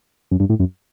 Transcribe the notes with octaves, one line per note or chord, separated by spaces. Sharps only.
F#2
G2
A2
F#2